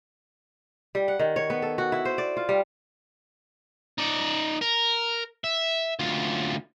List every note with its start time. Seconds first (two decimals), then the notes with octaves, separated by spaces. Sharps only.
0.95 G3
1.08 F#5
1.19 D#3
1.36 C#5
1.50 B3
1.62 A4
1.78 F#4
1.92 E4
2.05 C5
2.18 D5
2.37 F4
2.49 G3
3.98 D#4 D5
4.61 A#4
5.44 E5
5.99 D2 F4